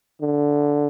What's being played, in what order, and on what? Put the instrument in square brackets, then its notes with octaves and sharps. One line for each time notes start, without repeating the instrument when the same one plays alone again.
[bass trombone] D3